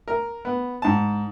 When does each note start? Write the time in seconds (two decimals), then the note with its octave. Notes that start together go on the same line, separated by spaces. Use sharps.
0.08 A#4
0.45 B3
0.82 G#2 A5